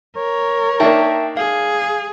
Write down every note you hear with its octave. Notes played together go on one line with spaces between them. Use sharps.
A#4 C#5
D#3 A#3 D4 E5 G5 A5
G#4 F5